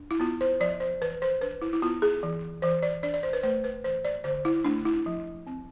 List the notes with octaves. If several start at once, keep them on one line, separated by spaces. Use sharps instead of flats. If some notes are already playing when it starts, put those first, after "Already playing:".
Already playing: D4
E4
B3 F4
C5
F3 D5
C5
E3 B4
C5
D4 B4
E4
E4
B3 F4
G#4
E3
E3 C5
D5
D4 D5
D5
C5
B4
A3 C5
B4
E3 C5
D5
D3 C5
E4
A3 D4
E4
F3
C4